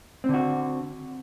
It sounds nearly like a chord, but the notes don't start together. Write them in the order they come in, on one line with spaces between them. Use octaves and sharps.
C4 D3 F#4